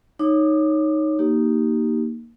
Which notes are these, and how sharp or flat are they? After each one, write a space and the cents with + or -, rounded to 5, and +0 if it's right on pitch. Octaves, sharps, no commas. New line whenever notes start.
D#4 +0 C#5 +0 D6 +20
A#3 +0 D#4 -5 G4 -15